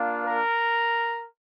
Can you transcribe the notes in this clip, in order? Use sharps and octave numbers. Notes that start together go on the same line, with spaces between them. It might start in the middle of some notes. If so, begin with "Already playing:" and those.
Already playing: A#3 D4 F4
A#4